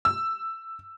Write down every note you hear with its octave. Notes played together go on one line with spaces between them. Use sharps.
E6